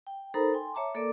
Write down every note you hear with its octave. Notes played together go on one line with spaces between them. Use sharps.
G5
D#4 A4 A#4 C5 A#5 B5
G5 G#5 C6
C#5 E5 A5 A#5 D6
A#3 A4 A#4 D5 D6